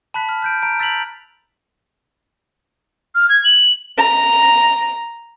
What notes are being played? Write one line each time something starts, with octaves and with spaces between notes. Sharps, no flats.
A5 B5 F#6 B6
F6
F#6 G6 D7
A#5 D7
E6 A6 B6 D7 F7 F#7
F6
G#6
F#7
A#5